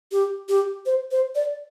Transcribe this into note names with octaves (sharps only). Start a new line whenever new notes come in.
G4
G4
C5
C5
D5